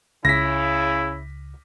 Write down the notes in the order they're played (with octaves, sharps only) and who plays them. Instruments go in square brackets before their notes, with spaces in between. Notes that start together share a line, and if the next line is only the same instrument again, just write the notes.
[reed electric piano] C#2 [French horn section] C#3 [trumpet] E4 [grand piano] A#6 B6